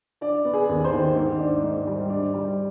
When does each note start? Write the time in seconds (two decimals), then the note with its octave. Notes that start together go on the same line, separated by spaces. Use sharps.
0.21 D4 D5
0.45 B3
0.54 G#4
0.69 D#2
0.84 C5
0.93 D#3
1.16 G#2
1.40 D4
1.63 G#2
1.87 G3
2.10 D4
2.34 G3